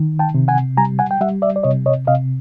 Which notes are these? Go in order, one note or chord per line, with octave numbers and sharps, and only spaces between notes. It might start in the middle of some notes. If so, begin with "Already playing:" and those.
Already playing: D#3
G5 A5
C3
F#5 G#5
G3 G#5 A#5
F#5 G#5
G5
G3 E5 F#5
D5 E5
D5
C3 C#5 D#5
C#5 D#5
C3 D#5 F5